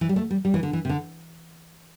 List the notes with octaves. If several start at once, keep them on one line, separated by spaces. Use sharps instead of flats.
E3
G3
A3
G3
G3
E3
D3
E3
C3
D3